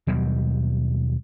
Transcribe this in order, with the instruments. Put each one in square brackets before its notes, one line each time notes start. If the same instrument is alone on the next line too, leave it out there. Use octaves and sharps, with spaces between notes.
[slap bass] D#2 B2 F#3 G3